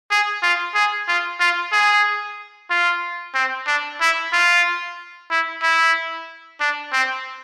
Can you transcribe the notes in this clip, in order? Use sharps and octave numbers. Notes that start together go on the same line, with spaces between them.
G#4
F4
G#4
F4
F4
G#4
F4
C4
D4
E4
F4
E4
E4
D4
C4